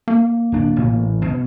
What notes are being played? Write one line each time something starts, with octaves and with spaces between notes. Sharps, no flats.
A#3
D1 D4
A1 A2
B2